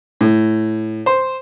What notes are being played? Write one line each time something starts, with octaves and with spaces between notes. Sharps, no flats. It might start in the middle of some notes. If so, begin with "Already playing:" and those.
A2
C5